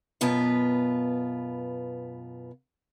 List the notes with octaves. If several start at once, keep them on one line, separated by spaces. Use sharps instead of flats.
F#2 B2 B3 F4 B4